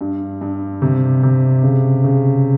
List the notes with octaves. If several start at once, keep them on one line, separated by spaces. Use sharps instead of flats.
G2
G2
C3
C3
C#3
C#3